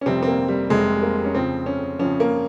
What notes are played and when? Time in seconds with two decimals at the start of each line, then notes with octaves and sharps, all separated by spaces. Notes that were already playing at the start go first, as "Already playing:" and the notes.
0.01 C#4
0.06 F1 F2 C3 G3 C4
0.23 C4
0.27 A#3
0.48 G3
0.70 F1 F2 C3 G3 G#3
1.03 A#3
1.25 C#4
1.35 F2 C#3 F3 C4
1.66 C#4
1.99 F2 C#3 F3 C#4
2.20 A#3